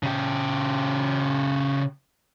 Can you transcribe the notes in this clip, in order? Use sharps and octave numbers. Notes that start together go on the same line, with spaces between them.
C#3 G4